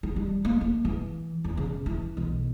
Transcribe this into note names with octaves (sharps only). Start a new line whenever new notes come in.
D#3
G3
A#3
A#3
E3
E2
C#3
E3
B1